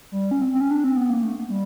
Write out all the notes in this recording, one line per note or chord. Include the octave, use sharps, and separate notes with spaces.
G3
C#4
C4
C4
C#4
D4
C4
B3
A#3
A3
G3